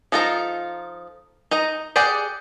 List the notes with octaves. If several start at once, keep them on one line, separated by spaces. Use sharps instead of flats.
F3 D#4 F4 A4 A#5
D#4 D#5 A#5
G4 G#4 D5 F#5 G5